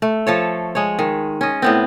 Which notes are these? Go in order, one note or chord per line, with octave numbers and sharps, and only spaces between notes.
A3
F3 A4 C#5
G#3 C#5
D#3
C#4 D#5
A2 B3 C4